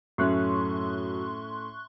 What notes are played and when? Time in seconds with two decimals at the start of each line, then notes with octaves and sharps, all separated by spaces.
0.18 F#2 A2 A3 C#4 C6 C#6 F#6